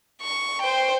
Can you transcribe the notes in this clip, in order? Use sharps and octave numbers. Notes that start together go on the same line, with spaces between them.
C#6
C5 G5